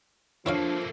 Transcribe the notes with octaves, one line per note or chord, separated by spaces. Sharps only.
F3 A3 A#3 D4 E4 C#5 F5